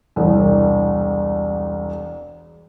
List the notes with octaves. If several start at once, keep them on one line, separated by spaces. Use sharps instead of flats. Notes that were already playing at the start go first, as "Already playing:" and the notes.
E1 C2